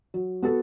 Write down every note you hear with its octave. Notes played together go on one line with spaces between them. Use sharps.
F#3
B3 F#4 A4